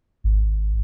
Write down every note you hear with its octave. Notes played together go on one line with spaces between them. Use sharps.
G#1